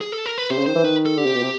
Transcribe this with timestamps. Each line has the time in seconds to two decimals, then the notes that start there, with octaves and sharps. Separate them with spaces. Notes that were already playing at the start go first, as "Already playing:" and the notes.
0.01 G#4
0.12 A4
0.26 A#4
0.38 B4
0.50 C3 C5
0.58 C#3
0.66 D#3 C5
0.75 E3
0.84 D#3 B4
1.06 A4
1.17 D3 G4
1.26 C3
1.34 B2
1.43 C3